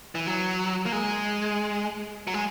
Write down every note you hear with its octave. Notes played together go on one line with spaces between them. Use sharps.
E3
F#3
A#3
G#3
F#3
G#3